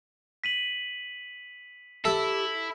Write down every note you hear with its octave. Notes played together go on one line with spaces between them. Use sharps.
B6 D#7 F#7
E4 G4 A4 E5